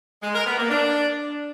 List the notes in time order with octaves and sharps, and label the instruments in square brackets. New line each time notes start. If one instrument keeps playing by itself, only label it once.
[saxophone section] G#3
A#4
B3
A#3
D4